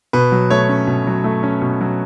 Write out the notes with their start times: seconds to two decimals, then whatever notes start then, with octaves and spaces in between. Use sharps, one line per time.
0.13 B2 B4
0.32 F#3
0.50 A3 C#5
0.69 C#4
0.87 B2
1.07 F#3
1.24 A3
1.43 C#4
1.62 B2
1.81 F#3